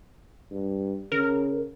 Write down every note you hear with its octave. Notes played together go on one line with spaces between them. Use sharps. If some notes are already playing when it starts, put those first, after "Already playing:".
G2
C#3 A#4